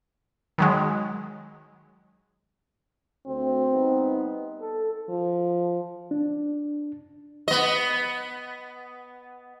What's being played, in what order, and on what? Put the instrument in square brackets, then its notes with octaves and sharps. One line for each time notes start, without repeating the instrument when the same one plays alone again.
[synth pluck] D#3 F#3 G#3
[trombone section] D2 [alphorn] C4
[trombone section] G3 B3 D#4
A4
[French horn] F3
[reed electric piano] D4
[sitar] B3 D#5